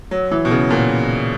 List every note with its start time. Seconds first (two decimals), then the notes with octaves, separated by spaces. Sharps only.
0.11 F#3
0.31 E3
0.45 B2
0.51 C#3
0.70 A#2